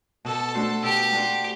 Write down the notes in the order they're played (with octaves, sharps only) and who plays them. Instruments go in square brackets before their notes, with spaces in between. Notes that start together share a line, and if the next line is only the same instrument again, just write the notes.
[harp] B2 [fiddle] A4
[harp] A3 D4 F#4 C5
[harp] B2 [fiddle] G4
[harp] A3 D4 F#4 C5